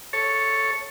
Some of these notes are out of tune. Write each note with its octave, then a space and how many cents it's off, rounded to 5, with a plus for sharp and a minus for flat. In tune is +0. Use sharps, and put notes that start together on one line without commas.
A4 +0 C#5 +0